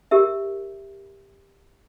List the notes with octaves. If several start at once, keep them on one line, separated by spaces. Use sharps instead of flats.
G4 A#4 E5